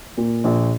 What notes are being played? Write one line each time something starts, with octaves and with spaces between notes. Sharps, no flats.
A#2
A#1